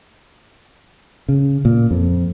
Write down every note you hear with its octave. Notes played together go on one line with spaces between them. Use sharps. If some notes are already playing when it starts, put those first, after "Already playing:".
C#3
A#2
F2